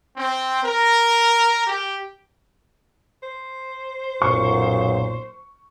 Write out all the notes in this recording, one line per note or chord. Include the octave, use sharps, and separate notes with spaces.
C4
A#4
G4
C5
B1 F#2 A#2 C#6